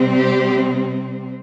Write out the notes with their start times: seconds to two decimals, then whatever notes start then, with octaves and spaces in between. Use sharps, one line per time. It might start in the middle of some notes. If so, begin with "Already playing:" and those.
Already playing: C3 G3 C4
0.17 G4